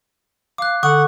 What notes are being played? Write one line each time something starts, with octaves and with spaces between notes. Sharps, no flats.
F5 D6 F#6
D3 F#5 C#6 D#6 F#6